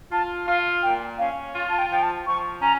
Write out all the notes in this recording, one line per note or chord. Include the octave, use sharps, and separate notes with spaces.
F4 A5
F4 F5
A#2 G5
C#4 F5
F4
A5
G5
F3 G5
A5
F3 C#6
C#4 A#5